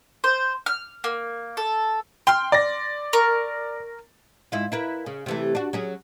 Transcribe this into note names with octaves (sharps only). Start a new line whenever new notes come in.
C5
F6
A#3
A4
G5 C6 F6
D5 A#6
A#4 C#6
G#2 E4 F4
E4 A#4 B4
C#3
C3 E3 A3
D4 F#4
F#3 C#4 G#4